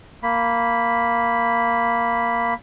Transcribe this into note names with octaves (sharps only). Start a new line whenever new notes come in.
A#3 B5